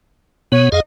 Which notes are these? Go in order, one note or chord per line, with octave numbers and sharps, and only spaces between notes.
B2 B3 C#5
F2 G#4 D#5 F5